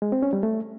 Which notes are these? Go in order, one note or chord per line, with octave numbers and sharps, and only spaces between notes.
G#3
C4
C#4
G3
A3